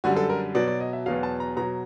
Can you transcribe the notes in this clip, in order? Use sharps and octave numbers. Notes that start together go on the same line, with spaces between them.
F#2 D3 G3 F#4
A4
A#4
B2 F#3 D5
D5
D#5
E5
E2 B2 F#3 F5
A5
A#5
B2 F#3 A#5